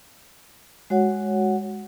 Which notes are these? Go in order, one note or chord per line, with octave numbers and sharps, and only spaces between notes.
G#3 F#4 C#5 F#5